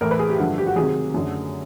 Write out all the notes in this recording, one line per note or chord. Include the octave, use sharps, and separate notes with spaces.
A2 E3 A3 A#4
B4
G#4
G4
G2 D3 F3 A3 F#4
G4
F#4
C3 D#3 F#3 G#4
F#2 D3 F#3 A3